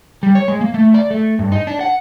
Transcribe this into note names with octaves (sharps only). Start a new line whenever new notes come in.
G3
C#5
G#3
A#3
A3
D5
A3
G2
D#4
D4
F#5